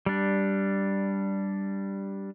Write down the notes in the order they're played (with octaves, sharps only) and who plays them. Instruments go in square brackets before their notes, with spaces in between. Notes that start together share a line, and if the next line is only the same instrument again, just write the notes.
[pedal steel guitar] G3 D4